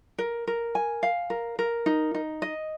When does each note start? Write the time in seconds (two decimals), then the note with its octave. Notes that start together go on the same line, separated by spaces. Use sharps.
0.18 A#4
0.47 A#4
0.75 G#5
1.03 F5
1.30 A#4
1.59 A#4
1.86 D#4
2.14 D#4
2.42 D#5